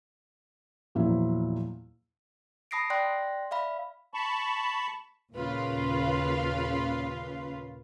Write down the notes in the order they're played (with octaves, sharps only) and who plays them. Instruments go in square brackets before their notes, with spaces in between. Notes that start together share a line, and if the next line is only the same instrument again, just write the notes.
[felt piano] E2 A#2 F3 F#3 E4
[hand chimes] A5 B5 D#6 A#6 C7 D7
D5 G5 C6 F#6 A#6
D5 E5 F5 B5
[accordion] A5 B5 C#6
[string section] D#2 A#2 C#3 F4 B4 F5